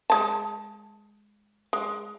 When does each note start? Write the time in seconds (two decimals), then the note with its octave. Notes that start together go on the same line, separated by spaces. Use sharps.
0.10 G#3 A5
1.73 G#3